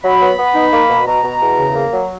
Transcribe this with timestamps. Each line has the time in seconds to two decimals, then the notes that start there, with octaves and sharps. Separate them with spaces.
0.03 F#3 B5
0.20 B3
0.37 B3
0.54 D#4
0.72 A#3
0.89 B2
1.07 B2 A#5
1.24 B2
1.41 E2
1.58 C#3
1.75 A#3
1.92 F#3